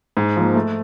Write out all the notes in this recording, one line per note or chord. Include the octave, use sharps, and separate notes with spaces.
G#2
F3 A#3
A3